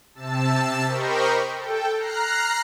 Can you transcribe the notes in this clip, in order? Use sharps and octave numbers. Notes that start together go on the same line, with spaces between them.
C3 A5 E6
G4 A#4 C5 D#5 B5 C#6
A4 G5
A#5 F6 F#6 C7